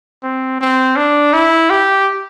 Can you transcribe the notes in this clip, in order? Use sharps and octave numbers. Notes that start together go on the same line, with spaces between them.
C4
C4
D4
E4
G4